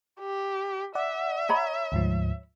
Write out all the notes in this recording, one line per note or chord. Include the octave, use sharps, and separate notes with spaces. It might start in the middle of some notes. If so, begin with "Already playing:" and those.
G4
D5 E5 F#5
C#5 A#5 B5
D2 G#2 F3